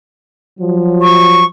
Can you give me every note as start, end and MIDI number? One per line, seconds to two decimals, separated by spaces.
0.59 1.41 53
0.59 1.41 54
1.01 1.45 85